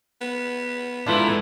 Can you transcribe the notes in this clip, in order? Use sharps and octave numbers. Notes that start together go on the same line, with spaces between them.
B3
G#2 A3 D4 E4 F4 B4